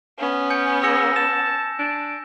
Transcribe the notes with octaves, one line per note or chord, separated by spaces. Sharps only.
B3 C#4
G#5 G6 C#7
G#4 E6 A#6 C#7
A5 E7
D4